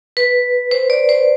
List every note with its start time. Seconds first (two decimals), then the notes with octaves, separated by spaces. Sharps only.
0.17 B4
0.71 C5
0.90 D5
1.09 C5